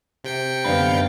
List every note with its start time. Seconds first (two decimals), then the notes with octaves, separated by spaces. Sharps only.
0.24 C3 G5 C#7
0.65 F#2 D3 B3 D4 B4 F5